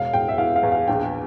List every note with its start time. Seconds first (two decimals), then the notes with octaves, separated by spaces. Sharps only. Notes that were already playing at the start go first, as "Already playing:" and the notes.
Already playing: E1 F5
0.13 E1 G5
0.28 E5
0.38 E3 F5
0.56 F5
0.63 E2
0.72 F5
0.88 A#1 G5